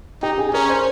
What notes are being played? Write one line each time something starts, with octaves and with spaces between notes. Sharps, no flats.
D#4 G4 G5
G#4 G#5
G#5
C#4 A#4 A#5
C5 C6